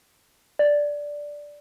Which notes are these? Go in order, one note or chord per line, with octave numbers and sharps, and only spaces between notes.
D5